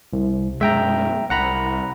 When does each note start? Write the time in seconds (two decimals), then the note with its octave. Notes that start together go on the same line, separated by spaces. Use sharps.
0.13 C2
0.61 F#2 B2 G#3 E5 G5 A#5
1.30 C2 F#5 A#5 B5